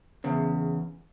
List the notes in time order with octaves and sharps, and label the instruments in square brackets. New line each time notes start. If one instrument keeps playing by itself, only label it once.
[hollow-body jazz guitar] E2 C#3